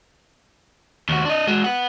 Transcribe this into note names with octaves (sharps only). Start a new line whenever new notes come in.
D#2 F#4
D4 D#5
G#3 F#4
B3 F#5